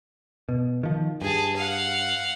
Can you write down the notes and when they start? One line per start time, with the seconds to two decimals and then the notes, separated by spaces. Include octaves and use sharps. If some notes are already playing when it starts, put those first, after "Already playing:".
0.49 B2
0.83 D#3 F3
1.22 G2 G#4 A5
1.56 F5 F#5